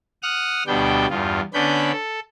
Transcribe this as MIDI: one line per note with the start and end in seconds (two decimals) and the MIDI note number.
0.23 0.63 78
0.23 0.63 87
0.23 0.63 89
0.23 0.63 90
0.67 1.06 38
0.67 1.06 47
0.67 1.06 55
0.67 1.06 59
0.67 1.06 62
0.67 1.06 79
1.10 1.41 40
1.10 1.41 43
1.10 1.41 65
1.54 1.92 50
1.54 1.92 59
1.54 1.92 61
1.54 1.92 62
1.54 1.92 83
1.54 1.92 91
1.92 2.20 69